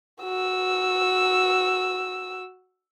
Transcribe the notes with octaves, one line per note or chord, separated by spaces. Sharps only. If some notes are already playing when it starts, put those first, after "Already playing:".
F#4 E6